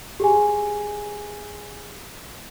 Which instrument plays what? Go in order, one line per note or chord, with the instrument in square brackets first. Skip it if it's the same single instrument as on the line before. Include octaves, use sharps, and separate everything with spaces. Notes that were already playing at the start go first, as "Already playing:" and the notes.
[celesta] G4 G#4 G#5